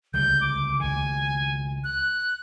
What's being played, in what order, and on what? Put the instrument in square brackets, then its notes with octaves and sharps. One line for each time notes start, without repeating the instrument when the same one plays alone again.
[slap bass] C#2 D3 G3 [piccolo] G6
[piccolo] D6
[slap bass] C#2 D#3 [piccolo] G#5
[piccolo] F#6